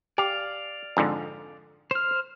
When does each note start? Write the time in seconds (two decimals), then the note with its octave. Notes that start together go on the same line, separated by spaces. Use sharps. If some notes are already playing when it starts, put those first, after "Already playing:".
0.18 G4 D5 F5
0.97 F2 G#2 D3
1.91 C5 F6